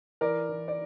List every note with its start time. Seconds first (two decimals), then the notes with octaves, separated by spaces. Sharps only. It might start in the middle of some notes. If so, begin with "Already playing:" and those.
0.21 E3 A#4 D5
0.49 E3
0.68 D5